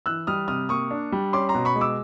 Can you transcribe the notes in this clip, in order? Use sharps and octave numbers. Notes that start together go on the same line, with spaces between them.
E3 E6 F#6
G3 D#6 F6
C3 D#6 F6
A#3 C#6 D#6
D4
G3
C#4 C6 D6
A#5 C6
B2
B5 C#6
G#3
D6 E6